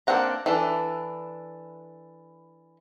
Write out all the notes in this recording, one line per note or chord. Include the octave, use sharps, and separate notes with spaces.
A#3 C4 D4 F#5 A#5
E3 D4 A4